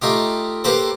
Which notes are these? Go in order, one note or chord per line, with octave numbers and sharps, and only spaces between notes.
A3 D#4 F4 G4
A#3 G4 A4 B4 C5